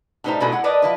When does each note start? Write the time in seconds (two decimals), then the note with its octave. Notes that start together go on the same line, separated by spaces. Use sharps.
0.24 A2 G3 D#4 B4 C5 A#5
0.40 B2 G3 G#3 B3 E4 A4
0.52 E4 F#5
0.64 A#4 B4 D5 D#5 A5
0.82 F3 E4 B4